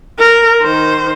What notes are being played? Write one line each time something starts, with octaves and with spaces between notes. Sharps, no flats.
A#4
D#3 C5